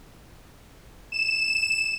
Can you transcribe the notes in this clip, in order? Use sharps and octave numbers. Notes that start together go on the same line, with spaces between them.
E7